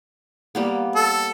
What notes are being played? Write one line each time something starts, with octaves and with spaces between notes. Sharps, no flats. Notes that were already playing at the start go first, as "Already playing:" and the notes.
G3 A#3 B3
A4